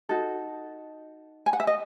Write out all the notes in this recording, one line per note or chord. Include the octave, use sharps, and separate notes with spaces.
D#4 F#4 A4
G#5
F#5
E5
D#5